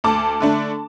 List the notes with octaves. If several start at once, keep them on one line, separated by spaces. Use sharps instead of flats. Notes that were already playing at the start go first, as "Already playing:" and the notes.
D2 A5 D6
D3 A3 D4